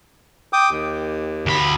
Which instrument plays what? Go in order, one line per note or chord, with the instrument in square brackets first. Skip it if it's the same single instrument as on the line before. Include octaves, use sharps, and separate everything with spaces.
[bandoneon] G5 D6 D#6
D#2
[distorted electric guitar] D2 B5